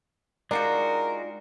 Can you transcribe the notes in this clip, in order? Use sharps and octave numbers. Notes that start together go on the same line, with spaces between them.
G#3 D4 D#4 F4 F#4 A#4 D5 G5